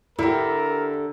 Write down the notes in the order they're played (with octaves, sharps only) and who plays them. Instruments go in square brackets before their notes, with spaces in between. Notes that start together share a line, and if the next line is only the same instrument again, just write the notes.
[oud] D3 G4 [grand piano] E4 [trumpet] A#4